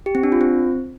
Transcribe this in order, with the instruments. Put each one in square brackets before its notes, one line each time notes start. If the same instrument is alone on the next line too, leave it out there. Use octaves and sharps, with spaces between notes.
[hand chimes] G4
C4
D4
F4
C4